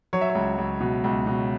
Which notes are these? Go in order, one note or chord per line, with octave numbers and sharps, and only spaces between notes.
F#3 C#5
E5
C#5
C#2
C#2
B2
C#2
B2